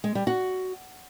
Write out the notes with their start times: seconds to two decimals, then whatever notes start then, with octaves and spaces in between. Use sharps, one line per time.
0.04 G#3
0.15 G3
0.27 F#4